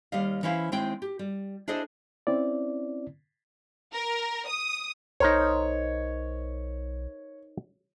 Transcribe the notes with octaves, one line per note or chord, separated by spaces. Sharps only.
D#2 G3 D#5 F5
E3 C#4 E4 C5 F5
D#2 G#3 C4 E4 G5
G4
G3
D4 E4 G#4 A4 C5 D#5
C4 C#4 E4 D5
A#4
D#6
B1 D#4 A#4 C5 C#5